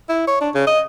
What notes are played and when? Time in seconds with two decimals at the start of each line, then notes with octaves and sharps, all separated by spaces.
0.09 E4
0.27 C#5
0.41 D4
0.55 C#3
0.67 D#5